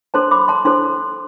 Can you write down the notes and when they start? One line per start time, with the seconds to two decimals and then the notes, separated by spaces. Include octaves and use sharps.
0.14 D4 A4 C5 A5 C6
0.31 B5 D6
0.48 A5 C6
0.65 D4 A4 C5 A5 C6